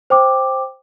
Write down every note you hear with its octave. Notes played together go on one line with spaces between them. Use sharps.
C5 G5 D6